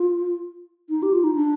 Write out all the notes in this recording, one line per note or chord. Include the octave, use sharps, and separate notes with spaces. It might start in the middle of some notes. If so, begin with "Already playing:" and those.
Already playing: F4
D#4
G4
F4
D#4
D4